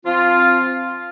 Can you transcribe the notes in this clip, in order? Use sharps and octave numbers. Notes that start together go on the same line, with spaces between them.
F3 C4 F4